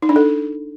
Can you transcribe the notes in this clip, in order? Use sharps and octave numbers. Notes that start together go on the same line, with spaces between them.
D#4
D4
A4